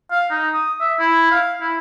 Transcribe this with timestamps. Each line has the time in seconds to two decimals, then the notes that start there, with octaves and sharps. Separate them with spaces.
0.12 F5
0.31 D#4
0.54 D#6
0.81 E5
1.00 E4
1.31 F5
1.61 E4